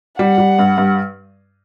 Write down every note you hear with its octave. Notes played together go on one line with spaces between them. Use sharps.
G3 F#5
G3
G2
G2